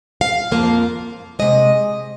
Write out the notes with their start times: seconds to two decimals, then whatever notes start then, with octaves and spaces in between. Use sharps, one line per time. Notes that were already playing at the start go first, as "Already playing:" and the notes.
0.21 F5
0.51 F2 F3 A#3
1.39 C3 G#3 D#5